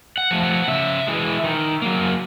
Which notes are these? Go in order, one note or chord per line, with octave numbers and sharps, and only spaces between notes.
F#5
F3 A3
F#5
C#3 E5
E3 G#3
D#3
F#3 A#3